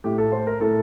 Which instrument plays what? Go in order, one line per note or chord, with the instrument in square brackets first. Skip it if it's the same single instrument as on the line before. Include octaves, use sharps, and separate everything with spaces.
[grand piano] A2 G4
A4
C5
A#4
A2 A4